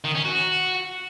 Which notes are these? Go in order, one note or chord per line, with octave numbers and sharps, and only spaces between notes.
D#3
C#4
F#4